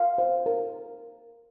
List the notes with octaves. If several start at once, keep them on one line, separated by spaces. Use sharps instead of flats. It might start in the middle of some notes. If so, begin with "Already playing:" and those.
Already playing: F5
C5
A#4